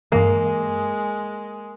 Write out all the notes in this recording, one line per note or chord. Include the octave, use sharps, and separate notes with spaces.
G2 E3 G#3 A#3